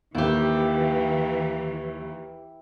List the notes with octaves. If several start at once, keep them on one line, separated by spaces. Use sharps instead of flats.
D#2 E3 E4 G4